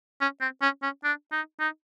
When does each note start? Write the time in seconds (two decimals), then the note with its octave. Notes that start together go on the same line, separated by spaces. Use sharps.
0.21 C#4
0.41 C4
0.62 C#4
0.82 C#4
1.04 D4
1.32 D#4
1.60 D#4